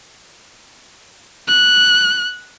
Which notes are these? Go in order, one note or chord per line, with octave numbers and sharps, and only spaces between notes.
F#6